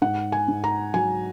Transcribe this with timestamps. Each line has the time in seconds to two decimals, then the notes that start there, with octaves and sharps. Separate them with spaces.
0.02 G#2 F#5
0.32 G#5
0.48 G#2
0.64 A#5
0.94 F#3 G#5